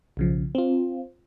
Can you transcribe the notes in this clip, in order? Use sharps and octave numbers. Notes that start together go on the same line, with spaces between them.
B1 C#3 F3
C4 F4